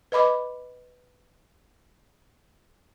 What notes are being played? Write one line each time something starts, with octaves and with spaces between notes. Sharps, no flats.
B4 D#5 B5 D6